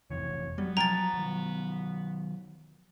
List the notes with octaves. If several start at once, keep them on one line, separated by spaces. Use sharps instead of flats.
F2 C3 E3 C#5
F#3 G3 B3
F3 G5 G#5 A#5 A6
D#3 F#3